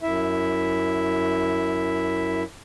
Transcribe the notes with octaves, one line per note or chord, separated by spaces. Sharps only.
F#2 E4 E5